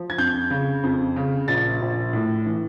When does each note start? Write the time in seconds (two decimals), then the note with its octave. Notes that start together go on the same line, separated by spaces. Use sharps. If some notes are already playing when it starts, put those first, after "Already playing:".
Already playing: F3
0.10 G#6
0.18 F2 G6
0.51 C#3
0.83 F2
1.16 C#3
1.48 A#1 A6
1.82 A#1
2.13 A2
2.46 E3